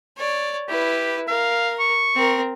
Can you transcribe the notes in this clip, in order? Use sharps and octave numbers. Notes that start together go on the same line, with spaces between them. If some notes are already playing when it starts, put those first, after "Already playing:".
C#5 D5
E4 G4 B4
A#4 F5
C#6
C4 A#4